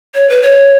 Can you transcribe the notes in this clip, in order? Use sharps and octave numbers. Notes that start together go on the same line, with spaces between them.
C#5
B4
C#5